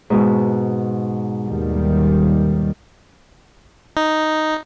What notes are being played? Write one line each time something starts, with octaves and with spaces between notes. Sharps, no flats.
G#2 B2
D#2 D#3 G3
D#4